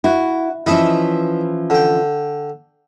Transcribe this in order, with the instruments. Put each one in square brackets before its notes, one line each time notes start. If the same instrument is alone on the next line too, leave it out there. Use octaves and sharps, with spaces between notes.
[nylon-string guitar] E4 [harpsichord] F#4
[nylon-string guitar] E3 F3 C#4 [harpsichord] E4 D#5 E5
[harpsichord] D3 G5